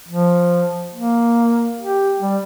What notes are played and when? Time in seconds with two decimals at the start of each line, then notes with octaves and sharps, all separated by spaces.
0.08 F3
0.94 A#3
1.81 G4
2.20 G3